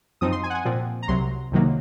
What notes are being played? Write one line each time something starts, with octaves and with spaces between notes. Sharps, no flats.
F#2 F3 C4 D#4 D#6
C6
G#5
F#5
G#5
A#2 F3 C4
A#5
C2 C3 F#3 C6
C2 C3 D#3 F#3 A#3